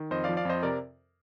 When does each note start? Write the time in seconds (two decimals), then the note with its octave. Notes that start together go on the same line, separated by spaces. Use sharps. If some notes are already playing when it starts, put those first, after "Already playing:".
Already playing: D#3
0.11 F2 C5 D#5
0.24 D5 F5
0.29 F3
0.37 D5 F5
0.45 F2 C5 D#5
0.63 C3 A#4 D5